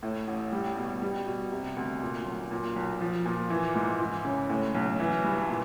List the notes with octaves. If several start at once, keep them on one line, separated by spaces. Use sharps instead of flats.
A2
A1
G3
B2
G3
B2
C3
D2
A#2
B1
A#2
B1
F3
A#2
E3
G#2
E3
C#3
A2
B1
E3
G2
A#2